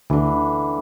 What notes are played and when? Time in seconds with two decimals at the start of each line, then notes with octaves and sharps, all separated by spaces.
0.10 D2 D3 E3